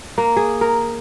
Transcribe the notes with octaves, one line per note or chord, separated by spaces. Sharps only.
A#3
G#4
A#4